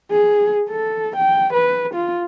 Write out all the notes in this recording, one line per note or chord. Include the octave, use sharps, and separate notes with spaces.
G#4
A4
G5
B4
F4